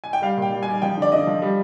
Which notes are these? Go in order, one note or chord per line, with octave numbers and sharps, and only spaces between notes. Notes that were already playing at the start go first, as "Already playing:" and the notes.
G#5
G5
G3 F5
A#2
G5
G3
G3 G#5
F3 G5
D3 D5
D3 D#5
F3
G3